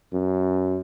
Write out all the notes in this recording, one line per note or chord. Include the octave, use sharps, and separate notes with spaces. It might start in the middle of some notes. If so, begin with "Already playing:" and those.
F#2